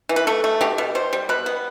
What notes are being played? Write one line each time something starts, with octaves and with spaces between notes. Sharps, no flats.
E3
B4
A3 A4
A3
B2 G4
B2
B2 C5
G3
B2 B4
B3